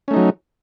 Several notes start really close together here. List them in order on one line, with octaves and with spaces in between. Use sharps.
C#4 A3 D#4 F#3